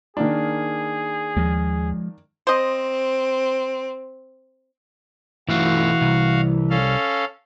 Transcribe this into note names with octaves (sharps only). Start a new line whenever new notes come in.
D#3 A#3 D4 G#4
D#2 F3 G#3
C4 C5 D#5
B1 E3 A3 F#4 F5
C2
C#4 A4 F5